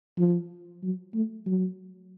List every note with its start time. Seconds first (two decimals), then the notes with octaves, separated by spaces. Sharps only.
0.18 F3
0.83 F#3
1.14 A3
1.46 F#3